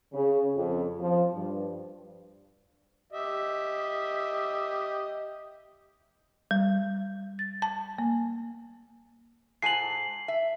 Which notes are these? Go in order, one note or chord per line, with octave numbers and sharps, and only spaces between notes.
C#3
F2
F3
G2
G4 D#5 E5
G3
A6
A5
A#3
G#2 G#5 A5 C7 F#7
E5